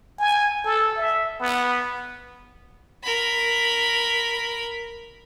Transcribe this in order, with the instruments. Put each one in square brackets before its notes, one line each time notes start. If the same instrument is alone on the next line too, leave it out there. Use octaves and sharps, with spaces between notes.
[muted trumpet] G#5
A4
E5
B3
[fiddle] A#4 B5